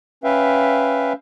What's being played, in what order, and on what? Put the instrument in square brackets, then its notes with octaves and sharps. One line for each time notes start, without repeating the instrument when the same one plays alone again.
[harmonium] C#4 B4 E5 F5 G5